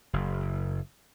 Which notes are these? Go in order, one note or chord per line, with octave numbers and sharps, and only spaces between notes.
F#1